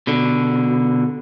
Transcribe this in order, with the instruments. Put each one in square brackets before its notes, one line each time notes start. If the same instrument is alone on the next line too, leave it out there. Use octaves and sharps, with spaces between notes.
[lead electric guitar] B2 D3